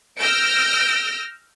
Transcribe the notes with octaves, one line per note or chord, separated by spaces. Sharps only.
E6 F6 G6 A#6 D7